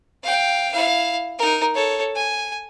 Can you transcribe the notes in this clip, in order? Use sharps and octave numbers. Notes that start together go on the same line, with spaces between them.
F5 G5
E4 F5
D#4 A#4
A4 C#5
G#5